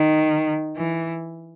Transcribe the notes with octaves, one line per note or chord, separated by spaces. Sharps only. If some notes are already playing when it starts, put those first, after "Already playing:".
Already playing: D#3
E3